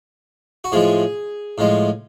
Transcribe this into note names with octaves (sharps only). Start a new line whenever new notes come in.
F#4
A2 F3 G#3 G#4
A2 F3 G#3